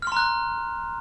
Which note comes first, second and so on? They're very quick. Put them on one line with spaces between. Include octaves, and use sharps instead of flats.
F6 C6 A#5 F#6